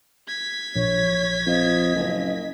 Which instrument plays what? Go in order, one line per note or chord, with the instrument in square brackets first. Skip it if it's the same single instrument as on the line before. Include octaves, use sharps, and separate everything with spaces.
[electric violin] G#6 B6
[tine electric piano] A#1 [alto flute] C#5
[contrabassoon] F2 [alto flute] D#5
[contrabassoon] F#1